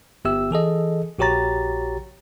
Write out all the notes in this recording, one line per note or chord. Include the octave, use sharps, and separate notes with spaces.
G1 B3 G4 E5 E6
E3 G#4 A4 D#5
A#1 F#4 G4 C#5 A#5 A6